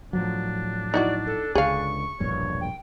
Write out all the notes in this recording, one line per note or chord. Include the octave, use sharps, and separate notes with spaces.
A2 F3 F#3 D4
D#4 E4 F#4 D5
A4
C#2 D3 G#4 F5 C#6
E1 A#1 G2 C#5
G5